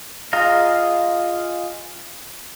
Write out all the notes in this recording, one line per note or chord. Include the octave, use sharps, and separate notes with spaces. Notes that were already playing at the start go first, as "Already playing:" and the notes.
F4 G#4 D#5 F5 A#5